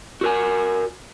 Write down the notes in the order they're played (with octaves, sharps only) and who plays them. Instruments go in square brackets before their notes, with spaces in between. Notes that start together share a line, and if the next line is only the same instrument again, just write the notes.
[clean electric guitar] F#4 A#4 G#5